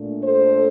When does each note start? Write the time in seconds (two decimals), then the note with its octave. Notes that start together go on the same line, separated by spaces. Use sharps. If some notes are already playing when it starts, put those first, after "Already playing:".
Already playing: A#2 A3 D4
0.24 A4 C5